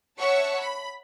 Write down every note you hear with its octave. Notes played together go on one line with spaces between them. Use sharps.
C#5 E5 F#5 A5 C#6
B5